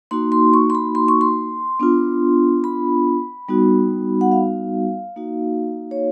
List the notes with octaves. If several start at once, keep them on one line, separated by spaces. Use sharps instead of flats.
A#3 D#4 F#4 C6
C6
C#6
C6
B5
C6
C#6
C6
B3 D4 F4
B5
G3 B3 D#4 F#4
F#5
F5
A#3 D#4 F#4
C#5